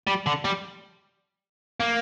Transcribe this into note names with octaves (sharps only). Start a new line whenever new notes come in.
G3
D3
G3
A#3